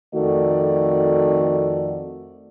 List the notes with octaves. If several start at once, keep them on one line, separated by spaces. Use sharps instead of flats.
F2 D#3 A3 F#4 D5